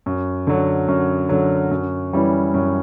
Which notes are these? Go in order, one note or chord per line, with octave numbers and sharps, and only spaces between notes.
F#2
D3 F#3
F#2
D3 F#3
F#2
E3 G3 C#4 E4
F#2